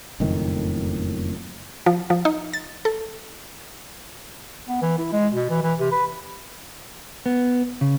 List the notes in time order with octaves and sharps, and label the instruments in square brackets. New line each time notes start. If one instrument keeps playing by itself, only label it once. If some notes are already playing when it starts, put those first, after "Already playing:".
[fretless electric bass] F#1 F2 A2 D#3
[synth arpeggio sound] F3
F3
D#4
A6
A4
[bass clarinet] B3
E3
E4
G#3
B2
E3
E3
C3
B4
[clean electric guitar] B3
C#3